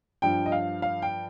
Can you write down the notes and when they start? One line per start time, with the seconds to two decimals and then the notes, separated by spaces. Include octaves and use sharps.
0.22 G2 F3 G5
0.46 D#5
0.52 F5
0.82 F5
1.02 G5